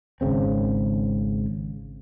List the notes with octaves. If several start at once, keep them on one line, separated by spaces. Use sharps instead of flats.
G#1 C#3 C4